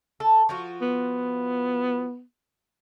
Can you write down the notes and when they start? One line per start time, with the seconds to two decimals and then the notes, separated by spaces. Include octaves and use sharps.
0.20 A4
0.49 F3 F4 F#4
0.82 B3